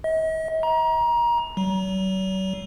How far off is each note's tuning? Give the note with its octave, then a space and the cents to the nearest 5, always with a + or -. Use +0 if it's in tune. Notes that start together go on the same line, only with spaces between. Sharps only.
D#5 +45
A#5 +25
F#3 +45